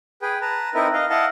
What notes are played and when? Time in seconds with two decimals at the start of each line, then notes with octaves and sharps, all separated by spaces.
0.22 G#4 B4 G5
0.42 B4 A5 A#5
0.74 C4 D#4 E4 A#4 B4
0.94 D#5 F5
1.10 E4 D#5 F5 F#5 A5